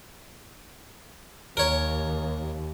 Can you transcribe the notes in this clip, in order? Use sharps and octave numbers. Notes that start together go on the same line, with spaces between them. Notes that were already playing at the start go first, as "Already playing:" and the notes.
D#2 A#4 C#5